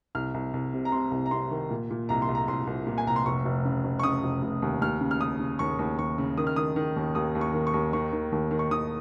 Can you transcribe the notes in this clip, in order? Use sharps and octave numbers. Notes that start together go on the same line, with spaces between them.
C2 F6
C2
C2
C3
A#5
C3 C6
C2
A#5
C3 C6
D#3
A#2
A#2
C2 A#5
C6
C2
A#5
C2 C6
C2
A#2
G#5
C2 A#5
C6
F1 C#6
F1
C#3
F1
C#6
C#3 D#6
F1
F1
D#2
D#2 F6
C#3
F6
C#3 D#6
C#3
D#2 C#6
D#2
D#2 C#6
C#3
D#3 D#6
F6
D#3 D#6
D#3
D#2
D#2 D#6
D#2
C#6
D#3
C#6
D#2
D#3 C#6
D#3
D#2
D#3
C#6
D#3 D#6